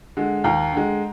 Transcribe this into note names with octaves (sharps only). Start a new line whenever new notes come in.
D3 G#3
D#2 G5 A#5
D3 G#3